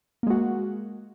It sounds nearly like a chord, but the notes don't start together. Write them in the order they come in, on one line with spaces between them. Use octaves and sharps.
A#3 G#3 F#4